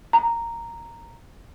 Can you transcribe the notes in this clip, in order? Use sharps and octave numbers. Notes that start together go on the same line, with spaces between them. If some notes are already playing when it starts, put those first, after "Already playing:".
A#5